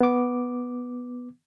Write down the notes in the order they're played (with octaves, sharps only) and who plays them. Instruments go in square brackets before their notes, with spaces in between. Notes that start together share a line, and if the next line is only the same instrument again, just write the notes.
[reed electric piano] B3 D6